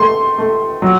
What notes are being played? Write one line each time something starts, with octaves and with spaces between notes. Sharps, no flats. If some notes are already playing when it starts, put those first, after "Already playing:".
Already playing: A3 C6
A3
F#3